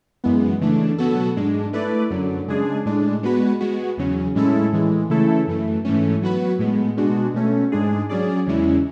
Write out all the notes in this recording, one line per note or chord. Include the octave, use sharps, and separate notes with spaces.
F#2 E3 G#3 B3
C#3 E3 A3 D4
B2 F#3 B3 F#4 A4
G#2 G#3 D4
A3 E4 B4 D5
F#2 D3 F#3
C#3 G#3 D4 G#4
A2 G#3 D4
G#3 B3 F#4 B4
G#3 B3 F#4
E2 C#3 F#3 C#4
A2 G#3 C#4 E4 A4
A2 E3 G#3
C#3 E3 A3 E4 A4
F#2 E3 A3
G#2 E3 A3 C#4
F#3 B3 F#4 B4
A2 G#3 B3
B2 G#3 D4 F#4
B2 A3 C#4
G#2 G#3 D4 G#4
F#3 C#4 G#4 D5
E2 C#3 G#3 C#4 E4